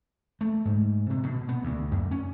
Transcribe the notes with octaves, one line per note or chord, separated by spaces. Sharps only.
A3
G#2
C3
B2
B3
D2
F#2
C#4